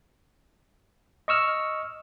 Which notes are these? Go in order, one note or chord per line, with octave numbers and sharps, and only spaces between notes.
D#5 C#6 E6 F6